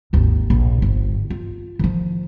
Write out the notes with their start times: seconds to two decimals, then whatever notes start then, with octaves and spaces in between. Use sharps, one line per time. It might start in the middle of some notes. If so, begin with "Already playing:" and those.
0.13 G#1 D#2
0.50 A#1
0.82 G1
1.30 F4
1.79 D#3 F3